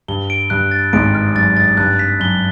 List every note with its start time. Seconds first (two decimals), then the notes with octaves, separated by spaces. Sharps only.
0.08 G2 G7
0.30 D7
0.50 G2 F#6
0.71 A6
0.93 G#1 G#2 D7
1.14 F6
1.35 F#2 A6
1.57 A6
1.77 G2 F#6
1.99 B6
2.20 F#2 G7